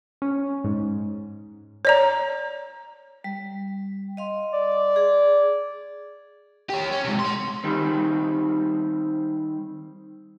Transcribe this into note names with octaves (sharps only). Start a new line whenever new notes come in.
C#4
G#2
C#5 D5 A#5
G3
D#5 F5 C6
D5
G#4
G4 C#5
C#4
G#2 C3
F#5 C6
D#3 G3 C4